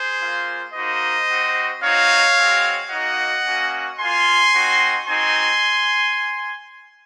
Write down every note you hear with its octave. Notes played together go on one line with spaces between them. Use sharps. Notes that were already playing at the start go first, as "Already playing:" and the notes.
Already playing: G#4 C5
A#3 F4
A#3 D#4 F#4 C5 D#5
C4 F#4
C4 D#4 F#4 C#5 F5
G#3 C4 F#4
A#3 D#4 F#4 D#5 F#5
A#3 C#4 F#4
A#3 F4 G#5 C6
C4 D#4 F#4
C4 D#4 F#4 G#5 C6